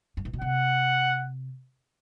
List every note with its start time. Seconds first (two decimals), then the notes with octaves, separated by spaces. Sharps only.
0.17 G2
0.25 A2
0.33 B2
0.41 C3 F#5